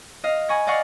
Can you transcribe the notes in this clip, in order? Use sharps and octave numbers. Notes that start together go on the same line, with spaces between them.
D#5 F5
G#5 B5 C#6 A#6
D5 D#5 F5 F#5 C#6